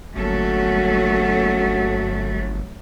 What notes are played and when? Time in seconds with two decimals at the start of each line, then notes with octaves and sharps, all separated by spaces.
0.16 G1 F#3 A3 A#3 C#4 F#4 A4